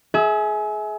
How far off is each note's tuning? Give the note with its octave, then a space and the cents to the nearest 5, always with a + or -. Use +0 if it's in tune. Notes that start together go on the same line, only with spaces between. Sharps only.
G#4 +25 E5 -25